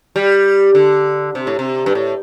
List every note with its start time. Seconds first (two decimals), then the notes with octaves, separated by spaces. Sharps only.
0.16 G3
0.75 D3
1.35 C3
1.47 A2
1.59 C3
1.86 G2
1.95 A2